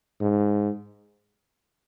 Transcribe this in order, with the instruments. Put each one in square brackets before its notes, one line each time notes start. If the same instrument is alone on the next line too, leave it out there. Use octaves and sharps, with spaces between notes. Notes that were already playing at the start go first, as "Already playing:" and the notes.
[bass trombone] G#2